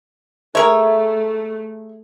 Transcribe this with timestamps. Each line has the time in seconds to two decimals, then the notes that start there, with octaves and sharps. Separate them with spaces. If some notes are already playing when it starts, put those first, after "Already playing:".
0.55 A3 G#4 A#4 C#5 E5